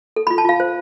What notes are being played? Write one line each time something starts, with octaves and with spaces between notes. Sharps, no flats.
A4
F4 B5
A5
F4 F5
C5